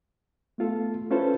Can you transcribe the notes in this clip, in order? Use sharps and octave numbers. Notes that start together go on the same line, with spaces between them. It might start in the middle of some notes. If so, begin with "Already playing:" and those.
A3 B3 F4 A4
C#4 E4 F4 A4 B4 C5